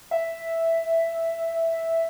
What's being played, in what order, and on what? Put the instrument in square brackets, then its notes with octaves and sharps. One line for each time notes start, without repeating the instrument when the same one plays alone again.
[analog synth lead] E5